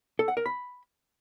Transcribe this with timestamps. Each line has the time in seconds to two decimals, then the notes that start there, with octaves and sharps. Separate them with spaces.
0.19 A4
0.28 F#5
0.37 A#4
0.46 B5